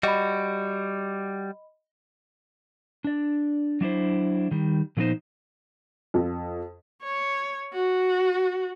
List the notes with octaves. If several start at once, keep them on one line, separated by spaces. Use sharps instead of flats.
G3 F#4 D#5 B5
D4 D5
F#3 D4 E4 C5
D#3 G3
A#2 F3 F#3 B3 D#4 C5
F2
C#5
F#4